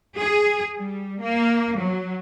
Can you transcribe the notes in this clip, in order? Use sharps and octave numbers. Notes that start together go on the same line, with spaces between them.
G#4
G3
A#3
F#3